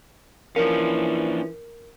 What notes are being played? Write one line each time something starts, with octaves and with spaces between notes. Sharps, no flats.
E3 F3 A#3 C#4 D4 A#4 F5